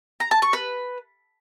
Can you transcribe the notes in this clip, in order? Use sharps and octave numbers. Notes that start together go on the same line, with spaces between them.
A#5
A5
C#6
B4